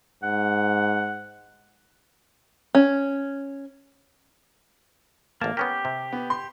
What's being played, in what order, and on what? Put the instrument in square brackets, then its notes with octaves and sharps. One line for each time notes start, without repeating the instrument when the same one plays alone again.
[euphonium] G#2 [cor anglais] F#5
[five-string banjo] C#4
[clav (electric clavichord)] A1 A5 [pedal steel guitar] A#3
[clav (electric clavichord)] B3 C#4 A#4 [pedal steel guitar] G4
[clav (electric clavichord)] C3
[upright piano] B3
C6